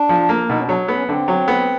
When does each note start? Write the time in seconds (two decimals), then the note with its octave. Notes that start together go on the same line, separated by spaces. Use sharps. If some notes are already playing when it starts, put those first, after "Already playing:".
Already playing: D4
0.09 F3
0.29 A#3
0.49 B2 D#4
0.59 C#4
0.64 F#3 D4
0.88 B3 C#4
1.08 D3 C4
1.28 F#3
1.48 B3